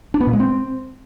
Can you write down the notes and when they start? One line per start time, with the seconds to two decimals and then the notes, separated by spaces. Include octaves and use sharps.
0.14 D4
0.20 B3
0.27 A#2
0.33 G#3
0.40 C4